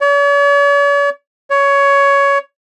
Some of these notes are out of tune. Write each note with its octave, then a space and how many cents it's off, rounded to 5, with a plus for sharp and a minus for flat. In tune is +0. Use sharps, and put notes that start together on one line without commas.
C#5 +45
C#5 +15